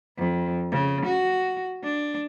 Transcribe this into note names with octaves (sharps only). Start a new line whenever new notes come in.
F2
C#3
F#4
D4